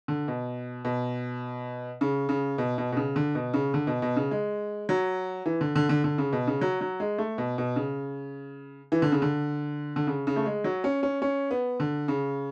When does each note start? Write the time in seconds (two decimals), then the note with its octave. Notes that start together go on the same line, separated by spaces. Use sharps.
0.08 D3
0.28 B2
0.85 B2
2.01 C#3
2.29 C#3
2.58 B2
2.78 B2
2.92 B2
2.97 C#3
3.16 D3
3.35 B2
3.54 C#3
3.74 D3
3.87 B2
4.02 B2
4.16 C#3
4.31 G#3
4.89 F#3
5.46 E3
5.61 D3
5.76 D3
5.89 D3
6.04 D3
6.18 C#3
6.33 B2
6.47 C#3
6.61 F#3
6.81 F#3
7.00 G#3
7.18 A3
7.38 B2
7.58 B2
7.76 C#3
8.92 E3
9.02 D3
9.12 C#3
9.22 D3
9.96 D3
10.07 C#3
10.27 C#3
10.36 A3
10.46 G#3
10.64 F#3
10.84 C#4
11.03 C#4
11.22 C#4
11.51 B3
11.80 D3
12.08 C#3